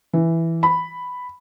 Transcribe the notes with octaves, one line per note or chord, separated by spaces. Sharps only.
E3
B5